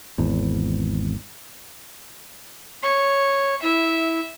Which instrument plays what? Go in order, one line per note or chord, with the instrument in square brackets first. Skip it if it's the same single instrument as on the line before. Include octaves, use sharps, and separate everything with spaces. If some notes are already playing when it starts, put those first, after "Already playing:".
[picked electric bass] G#1 E2
[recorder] C#5 [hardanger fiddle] C#6
[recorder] E4 [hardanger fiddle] E5